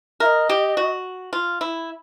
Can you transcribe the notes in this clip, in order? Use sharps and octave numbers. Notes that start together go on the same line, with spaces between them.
A#4 E5
D#5
G4
F#4
F4
E4